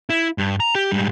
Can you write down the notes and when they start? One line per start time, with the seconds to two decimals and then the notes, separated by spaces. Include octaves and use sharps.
0.10 E4
0.38 G2
0.60 A#5
0.75 G4
0.92 G#2 G3